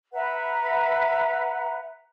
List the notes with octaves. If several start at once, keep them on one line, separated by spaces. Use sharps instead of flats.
B4 E5 F#5 A#5